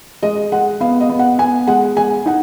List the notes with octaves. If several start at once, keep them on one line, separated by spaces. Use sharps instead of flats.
G#3 D#5
G#3 F#5
B3 F5
D#5
B3
F#5
B3 G#5
G#3 F#5
G#3 G#5
D#4 F#5